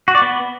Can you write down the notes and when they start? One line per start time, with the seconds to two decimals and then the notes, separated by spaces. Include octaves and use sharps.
0.08 F#4
0.15 D5
0.22 B3